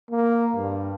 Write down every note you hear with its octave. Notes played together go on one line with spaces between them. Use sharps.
A#3
G2